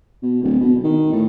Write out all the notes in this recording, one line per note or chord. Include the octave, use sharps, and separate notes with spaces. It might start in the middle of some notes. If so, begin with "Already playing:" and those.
B2
D1
B2
D#3
A2